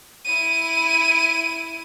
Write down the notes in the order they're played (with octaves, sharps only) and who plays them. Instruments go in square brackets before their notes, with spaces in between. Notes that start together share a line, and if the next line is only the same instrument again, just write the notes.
[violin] E4 D#7